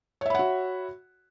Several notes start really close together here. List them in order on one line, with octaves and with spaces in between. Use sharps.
C#5 E5 B5 F#5 F#4